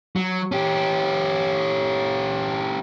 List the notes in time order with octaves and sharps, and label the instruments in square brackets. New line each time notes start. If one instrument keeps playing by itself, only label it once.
[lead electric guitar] F#3
C#4 G4